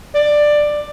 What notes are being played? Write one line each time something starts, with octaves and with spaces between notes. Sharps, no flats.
D5